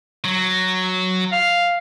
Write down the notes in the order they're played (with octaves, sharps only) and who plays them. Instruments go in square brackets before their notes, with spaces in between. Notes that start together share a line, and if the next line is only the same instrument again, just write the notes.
[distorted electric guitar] F#3
[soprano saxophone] F5